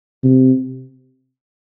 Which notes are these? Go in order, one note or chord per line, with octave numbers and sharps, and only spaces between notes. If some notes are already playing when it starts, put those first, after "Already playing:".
C3